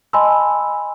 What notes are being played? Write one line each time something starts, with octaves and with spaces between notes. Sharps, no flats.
D#5 G#5 A5 B5 C6 E6